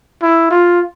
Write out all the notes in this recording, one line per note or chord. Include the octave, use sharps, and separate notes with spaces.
E4
F4